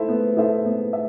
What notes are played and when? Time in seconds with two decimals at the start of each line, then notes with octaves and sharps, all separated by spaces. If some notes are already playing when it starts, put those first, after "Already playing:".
Already playing: E4 A4 C5 E5
0.09 B3
0.37 E4 A4 C5 E5
0.65 B3
0.93 E5